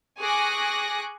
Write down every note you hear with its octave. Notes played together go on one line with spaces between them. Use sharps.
G#4 G#5 C#6 D6 F#6 A#6